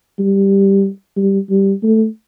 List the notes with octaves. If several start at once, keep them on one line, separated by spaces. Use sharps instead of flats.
G3
G3
G3
A3